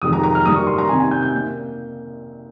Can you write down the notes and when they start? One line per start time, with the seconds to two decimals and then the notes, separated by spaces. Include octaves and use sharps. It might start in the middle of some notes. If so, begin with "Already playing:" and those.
0.02 F2 C3 D#3 G#3 D#6
0.13 A#5
0.23 A#5
0.35 F6
0.45 G2 D#3 G3 A#3 D#6
0.56 C#6
0.67 C6
0.78 A#5
0.89 C3 D#3 G3 C4 G#5
1.00 G#5
1.11 G6
1.22 G6
1.33 A#3